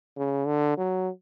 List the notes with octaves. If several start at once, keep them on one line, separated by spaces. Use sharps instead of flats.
C#3
D3
F#3